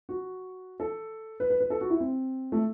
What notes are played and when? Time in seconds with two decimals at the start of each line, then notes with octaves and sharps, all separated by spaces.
0.09 F#4
0.80 A4
1.40 B4
1.50 B4
1.60 B4
1.70 A4
1.81 F#4
1.90 E4
2.00 C4
2.52 A3